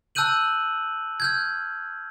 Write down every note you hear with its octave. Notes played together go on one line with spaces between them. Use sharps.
A5 E6 F#6 G6 D#7 F#7
F6 G6 G#6